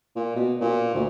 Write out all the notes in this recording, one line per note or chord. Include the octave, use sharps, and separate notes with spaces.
A#2
B2
A#2
D2